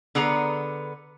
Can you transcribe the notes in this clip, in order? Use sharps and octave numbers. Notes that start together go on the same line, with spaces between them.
D3 B3 G#4 A#5